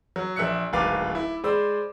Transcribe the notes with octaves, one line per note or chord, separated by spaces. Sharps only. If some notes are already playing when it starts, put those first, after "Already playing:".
F#3
A#1 E5 E6 F#6 C#7
D1 G#1 B4 F5 D6 A6
E4
G#3 C5 D5 B5 E6